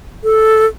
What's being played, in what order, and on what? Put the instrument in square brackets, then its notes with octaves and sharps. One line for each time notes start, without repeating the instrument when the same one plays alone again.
[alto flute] A4